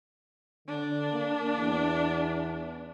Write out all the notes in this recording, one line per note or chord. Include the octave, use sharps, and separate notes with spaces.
D3 D4
A#3
E2